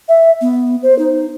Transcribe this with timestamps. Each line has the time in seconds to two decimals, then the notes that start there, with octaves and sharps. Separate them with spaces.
0.09 E5
0.41 B3
0.83 C5
0.99 D#4